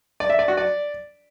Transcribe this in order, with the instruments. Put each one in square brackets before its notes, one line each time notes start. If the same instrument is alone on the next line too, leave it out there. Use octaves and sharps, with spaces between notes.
[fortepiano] D5
E5
D5
F#4
D5